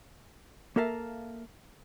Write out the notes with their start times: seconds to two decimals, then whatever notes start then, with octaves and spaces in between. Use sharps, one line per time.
0.76 A#3 A4 A#4 E5 F5 A5